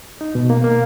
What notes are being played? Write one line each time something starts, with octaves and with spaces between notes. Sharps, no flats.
D#4
B2
A#3
A#3